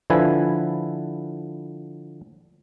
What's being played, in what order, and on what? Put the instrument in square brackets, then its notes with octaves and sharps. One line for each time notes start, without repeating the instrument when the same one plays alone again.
[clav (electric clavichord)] D3 F3 E4 B4 G#5